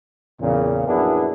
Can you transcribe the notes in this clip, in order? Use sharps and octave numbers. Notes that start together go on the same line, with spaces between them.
E2 A#2 C#3
A#1 F#2 B3 D4 E4 G#4